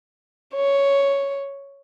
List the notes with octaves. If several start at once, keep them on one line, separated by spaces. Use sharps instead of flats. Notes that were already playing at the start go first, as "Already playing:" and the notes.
C#5